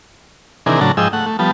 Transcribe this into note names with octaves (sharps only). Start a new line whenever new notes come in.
C3 D#3 E3 D4 G#4 A#4
A2 C#3 F#3 D4 A5 A#5
G#2 F3 G#4 D#5 G5 E6
A3 F#5
A3
F3 G3 B3 A5